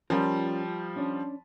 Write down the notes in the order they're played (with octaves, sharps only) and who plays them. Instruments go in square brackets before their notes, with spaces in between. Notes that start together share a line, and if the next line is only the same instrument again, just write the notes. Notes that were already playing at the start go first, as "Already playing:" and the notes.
[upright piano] F3 G3 [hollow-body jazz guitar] C#4 F4 A#4
[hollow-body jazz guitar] C#4 D4